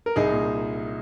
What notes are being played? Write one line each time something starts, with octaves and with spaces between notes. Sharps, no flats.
A#4
C2 D#4 G#4
A#2